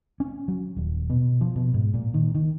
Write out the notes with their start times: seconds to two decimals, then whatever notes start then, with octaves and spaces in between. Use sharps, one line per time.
0.20 C#4
0.48 F#3
0.77 D#1
1.10 B2
1.41 F3
1.56 B2
1.74 G#2
1.94 A#2
2.14 D#3
2.35 D#3